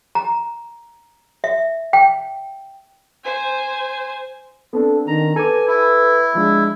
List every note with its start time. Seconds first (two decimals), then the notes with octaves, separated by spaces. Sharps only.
0.15 A#5
1.44 E5
1.93 G5
3.24 C5 G#5
4.73 B3 C4 D4 A4
5.07 D#3 A#5
5.36 A4 B4 G#5 D6
5.68 E4
6.35 F3 G#3 D4